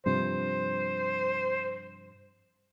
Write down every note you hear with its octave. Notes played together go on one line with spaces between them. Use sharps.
G2 C3 F3 C5